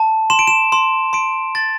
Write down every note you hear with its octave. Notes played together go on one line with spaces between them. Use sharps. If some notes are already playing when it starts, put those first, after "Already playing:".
Already playing: A5
C6 E7
D7
E7
C6
C6 D7
C6 A6